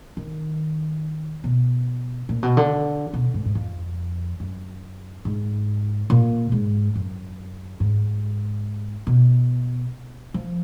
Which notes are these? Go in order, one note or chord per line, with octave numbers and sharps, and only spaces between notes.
D#3
B2
A#2
B2
D3
B2
G#2
G#2
F2
F#2
G#2
A#2
G#2
F#2
G#2
B2
F3